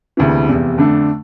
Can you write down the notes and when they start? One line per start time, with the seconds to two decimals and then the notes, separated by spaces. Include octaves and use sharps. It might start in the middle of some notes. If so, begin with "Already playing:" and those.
0.17 E1 D2 C3 E3
0.48 F1 E2 C3
0.78 F2 D3 A3 D4